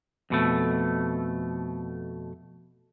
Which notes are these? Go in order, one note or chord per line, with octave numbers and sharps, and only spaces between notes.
F2 B2 A3